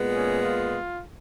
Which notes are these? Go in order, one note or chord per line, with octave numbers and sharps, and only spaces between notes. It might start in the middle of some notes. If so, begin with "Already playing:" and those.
Already playing: A#2 G#3 B3
C#4
F4